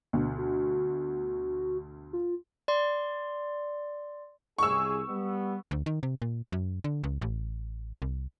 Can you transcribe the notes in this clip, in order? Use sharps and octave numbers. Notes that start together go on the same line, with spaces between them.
D2 B2
F#4
F4
D5 C6
C2 G#4 C#6 E6
G3 B3
D2
D#3
C3
A#2
F#2
D3
C#2
A1
C2